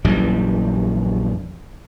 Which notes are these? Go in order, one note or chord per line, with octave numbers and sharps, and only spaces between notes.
A#1 F#2 E3 G3